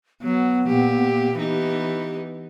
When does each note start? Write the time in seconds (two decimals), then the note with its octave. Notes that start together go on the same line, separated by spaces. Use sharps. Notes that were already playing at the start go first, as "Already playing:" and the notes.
0.22 F#3 B3
0.68 A#2 G4
1.37 E3 B3 D#4 G4